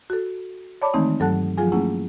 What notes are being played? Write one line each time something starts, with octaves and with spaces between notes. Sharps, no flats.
F#4 A4
C#5 D5 A5 B5 D6
D#3 E3 G#3 A3 C4 D#4
G2 F#3 A4 F#5 A5 F#6
F3 F#3 F4 G#4 G#5
A3 A#3 C#4 E4 G#4 F#5